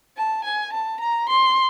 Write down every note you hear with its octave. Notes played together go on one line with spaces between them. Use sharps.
A5
G#5
A5
A#5
C6